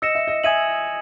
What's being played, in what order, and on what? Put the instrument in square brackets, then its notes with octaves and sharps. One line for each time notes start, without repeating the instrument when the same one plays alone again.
[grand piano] D#5 [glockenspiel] E6 A#6 C#7 E7
[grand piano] E5
D#5
[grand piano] E5 [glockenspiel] G#5 D#6 G#6 D#7 F#7